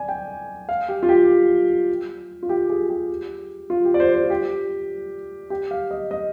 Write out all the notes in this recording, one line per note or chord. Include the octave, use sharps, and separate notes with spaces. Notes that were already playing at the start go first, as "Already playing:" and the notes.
Already playing: D5 G#5
G5
F5
G4
F4
G4
F4
G4
G#4
G4
F4
G4
D5
C5
C5
F4
G4
G4
F5
D#5
D#5